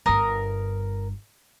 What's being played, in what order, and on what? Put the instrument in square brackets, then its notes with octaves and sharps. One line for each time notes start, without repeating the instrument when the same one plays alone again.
[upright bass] G1 G2 [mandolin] A#4 D#6